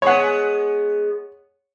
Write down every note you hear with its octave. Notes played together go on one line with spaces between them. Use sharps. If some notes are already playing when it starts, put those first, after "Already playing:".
G#3 B3 C#5 F#5